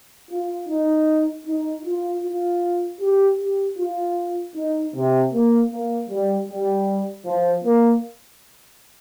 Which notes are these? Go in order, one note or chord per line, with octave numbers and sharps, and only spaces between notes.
F4
D#4
D#4
F4
F4
G4
G4
F4
D#4
C3
A#3
A#3
G3
G3
F3
A#3